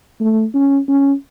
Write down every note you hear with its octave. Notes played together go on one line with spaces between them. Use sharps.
A3
C#4
C#4